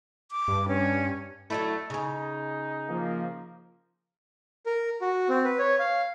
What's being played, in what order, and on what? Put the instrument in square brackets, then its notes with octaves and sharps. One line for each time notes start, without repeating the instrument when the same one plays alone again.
[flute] D6
[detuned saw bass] G2
[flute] C#4
[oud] F#3 D4 E4 [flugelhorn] A3
[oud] C#3 C#4 [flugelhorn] D#4
[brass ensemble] F3 A#3
[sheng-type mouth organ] A#4
F#4
C4
B4
C#5
F5